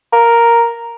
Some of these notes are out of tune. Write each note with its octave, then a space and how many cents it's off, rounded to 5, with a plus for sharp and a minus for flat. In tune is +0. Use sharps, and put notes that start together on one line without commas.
A#4 +0